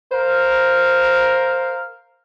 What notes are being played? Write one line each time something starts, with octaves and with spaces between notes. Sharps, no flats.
A#4 C5 F5